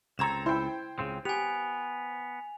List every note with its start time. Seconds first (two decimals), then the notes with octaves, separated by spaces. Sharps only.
0.19 C#2 C4 A4 A#5 G#6 E7
0.46 E4 C5 G5
0.99 C#2 C#3 C4
1.25 B3 G4 G#5 F7